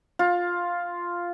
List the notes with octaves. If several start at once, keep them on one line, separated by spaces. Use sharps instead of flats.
F4